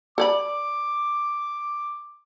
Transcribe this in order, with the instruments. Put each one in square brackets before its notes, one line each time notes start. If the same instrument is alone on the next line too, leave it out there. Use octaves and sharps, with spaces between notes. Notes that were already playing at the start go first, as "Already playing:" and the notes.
[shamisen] A4 D5 B5 [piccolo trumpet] D6